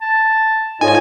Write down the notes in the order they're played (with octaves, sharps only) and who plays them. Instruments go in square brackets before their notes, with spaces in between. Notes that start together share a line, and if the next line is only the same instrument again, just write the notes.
[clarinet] A5
[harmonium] G#2 F4 D#5 [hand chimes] D#4 A4 C#5 [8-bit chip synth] G#5